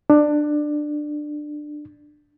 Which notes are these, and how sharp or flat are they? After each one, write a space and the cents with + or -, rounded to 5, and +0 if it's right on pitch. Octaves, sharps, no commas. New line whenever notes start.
D4 +20